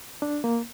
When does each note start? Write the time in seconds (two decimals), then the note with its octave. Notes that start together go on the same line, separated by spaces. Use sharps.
0.22 D4
0.44 A#3